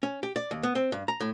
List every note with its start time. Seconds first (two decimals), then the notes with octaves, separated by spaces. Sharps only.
0.03 C#4
0.23 G4
0.36 D5
0.51 D#2
0.63 B3
0.75 C4
0.92 G2
1.08 A#5
1.20 A2